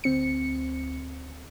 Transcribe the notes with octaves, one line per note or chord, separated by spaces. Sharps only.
D2 C4 C#7